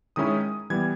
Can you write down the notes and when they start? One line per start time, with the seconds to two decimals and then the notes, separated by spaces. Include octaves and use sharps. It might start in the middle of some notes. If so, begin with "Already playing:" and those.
0.16 D#3 G#3 C#4 E4 D#6
0.70 E3 G3 B3 G#6